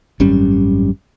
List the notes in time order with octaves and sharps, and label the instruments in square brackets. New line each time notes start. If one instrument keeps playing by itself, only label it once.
[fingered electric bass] G#1 F#2 G3 C#4